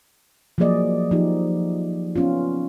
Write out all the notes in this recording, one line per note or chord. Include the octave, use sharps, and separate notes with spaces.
F3 F#3 A#3 G#4 D5 D#5
F3 D#4 G4
B3 C#4 F4